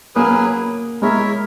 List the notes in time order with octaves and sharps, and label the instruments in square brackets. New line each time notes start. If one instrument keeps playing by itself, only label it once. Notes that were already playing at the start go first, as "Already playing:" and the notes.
[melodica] F#3 C#4 G#4 B4 [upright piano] A#3
[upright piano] G#3 [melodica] E4 A#4 C#5 E5